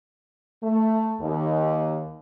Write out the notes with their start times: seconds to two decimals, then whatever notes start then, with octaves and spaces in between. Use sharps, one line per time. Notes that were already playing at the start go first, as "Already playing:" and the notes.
0.63 A3
1.21 D#2